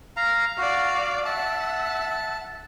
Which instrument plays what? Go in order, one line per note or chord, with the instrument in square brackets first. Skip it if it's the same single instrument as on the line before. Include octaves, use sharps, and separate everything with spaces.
[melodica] F5 A#5
[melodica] F#4 [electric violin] D5 F5
[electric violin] E5 F#5 [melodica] A5